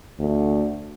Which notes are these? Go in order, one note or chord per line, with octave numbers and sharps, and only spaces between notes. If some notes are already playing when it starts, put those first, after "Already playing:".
D2